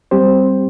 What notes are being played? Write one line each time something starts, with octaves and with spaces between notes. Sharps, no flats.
G3 C4 G4 C5